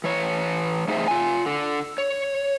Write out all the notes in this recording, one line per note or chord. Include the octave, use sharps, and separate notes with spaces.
E3 C#5
A3 D#4 G#4 B4 C5 E5
F4 G#5
D3
C#5